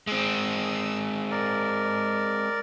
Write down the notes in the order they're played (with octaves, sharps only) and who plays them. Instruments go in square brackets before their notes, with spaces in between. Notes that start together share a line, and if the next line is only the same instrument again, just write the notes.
[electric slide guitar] G#3 C4 [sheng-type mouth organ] D#6 E6
[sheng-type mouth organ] A#4 D5